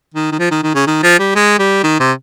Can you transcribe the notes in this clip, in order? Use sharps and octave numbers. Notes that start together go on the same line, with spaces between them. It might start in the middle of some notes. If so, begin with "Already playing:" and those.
D#3
D#3
F3
D#3
D#3
C#3
D#3
F3
G3
G#3
G3
D#3
C3